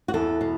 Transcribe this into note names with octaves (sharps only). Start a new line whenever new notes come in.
F#4
E2 A4
B2